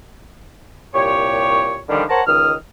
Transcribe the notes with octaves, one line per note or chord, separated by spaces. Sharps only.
C2 A#2 G4 C#5
D3 D#3 F3 G3 C#4 D4
A#4 C5 C#5 F#5 A5 A#5
C#2 D#3 D#6 F6